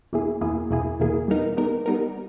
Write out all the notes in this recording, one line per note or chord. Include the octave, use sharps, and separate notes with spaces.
E2 B2 A#3 E4 G#4
E2 B2 A#3 E4 G#4
E2 B2 A#3 E4 G#4
E2 B2 A#3 E4 G#4
G3 B3 D#4 A#4
G3 B3 D#4 A#4
G3 B3 D#4 A#4